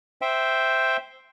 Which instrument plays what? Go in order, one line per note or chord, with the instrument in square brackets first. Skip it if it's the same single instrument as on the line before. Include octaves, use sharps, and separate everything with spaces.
[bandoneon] C5 E5 G5